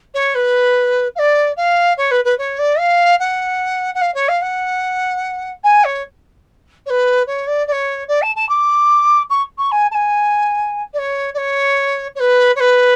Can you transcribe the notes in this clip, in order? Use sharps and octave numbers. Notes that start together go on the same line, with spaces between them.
C#5
B4
F5
D5
F5
C#5
B4
B4
C#5
D5
F5
F#5
F#5
F5
C#5
F5
F#5
G#5
C#5
C#5
B4
C#5
D5
D5
C#5
D5
A5
A5
D6
C#6
C#6
G#5
A5
G#5
D5
C#5
D5
C#5
C#5
B4
C#5
B4